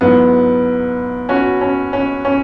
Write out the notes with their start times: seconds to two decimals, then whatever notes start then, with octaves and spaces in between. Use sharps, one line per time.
0.01 G#2 F#3 B3 E4
1.29 C#4 F#4
1.61 C#4
1.93 C#4
2.25 C#4